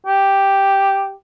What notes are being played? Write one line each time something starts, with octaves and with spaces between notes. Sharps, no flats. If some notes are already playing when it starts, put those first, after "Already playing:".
G4